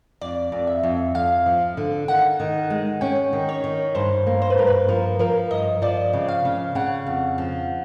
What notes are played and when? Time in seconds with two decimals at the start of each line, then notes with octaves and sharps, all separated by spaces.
0.21 F2 D5
0.52 F2
0.67 E5
0.83 F2
1.15 F2 F5
1.46 F3
1.77 D3
2.08 D#3 F#5
2.40 D#3
2.70 G#3
3.01 C#4 G5
3.33 D#3
3.49 C#5
3.64 D#3
3.95 G2 C5
4.26 A#3
4.42 C5
4.50 B4
4.58 G2 A#4
4.67 B4
4.88 F3 A#4
5.19 F3 A#4
5.51 G2 D#5
5.82 F3 D5
6.13 C#3
6.28 F5
6.45 C#3
6.75 C#3 F#5
7.07 F2
7.38 F3